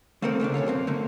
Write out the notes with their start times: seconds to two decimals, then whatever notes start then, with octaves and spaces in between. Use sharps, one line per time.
0.22 A3 A#3 C4 A4 A#4
0.40 D2 C#3 A3 D4
0.54 A#2 A4 C#5 F5
0.66 F#2 B2 C4
0.87 D3 A3 A#3